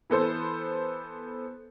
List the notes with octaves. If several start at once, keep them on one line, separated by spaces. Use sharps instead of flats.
E3 B3 A4 C5